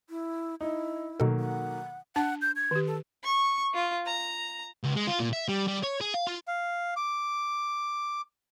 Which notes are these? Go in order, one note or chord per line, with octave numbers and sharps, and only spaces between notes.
E4
D#4 E4
B2 D#3 F#3 A#3 A4
F#5
D4 F#5 A5
G6
G#6
D#3 G4
A4
C#6
F4
A#5
C#2
G#3
F4
A#2
E5
G3
G3
C#5
G#4
F5
F4
F5
D6